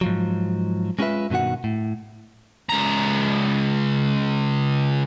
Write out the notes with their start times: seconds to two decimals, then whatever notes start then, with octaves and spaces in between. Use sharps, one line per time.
0.01 G#2 F3 F#3
0.99 G#3 C#4 F4 G4 B4 E5
1.30 G2 B2 D#3 F#4 F#5
1.64 A2
2.69 C#2 A#5